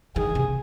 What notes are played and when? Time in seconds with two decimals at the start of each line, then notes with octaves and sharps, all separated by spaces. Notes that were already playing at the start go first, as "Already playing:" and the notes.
0.16 D#3 G#4
0.35 C3